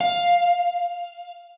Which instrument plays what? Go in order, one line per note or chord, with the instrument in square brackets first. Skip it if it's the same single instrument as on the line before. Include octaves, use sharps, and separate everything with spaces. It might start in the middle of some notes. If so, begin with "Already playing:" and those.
[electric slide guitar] F5